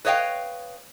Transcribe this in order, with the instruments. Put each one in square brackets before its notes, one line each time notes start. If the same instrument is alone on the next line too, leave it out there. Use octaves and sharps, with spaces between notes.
[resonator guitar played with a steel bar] B4 C#5 D#5 F5 G5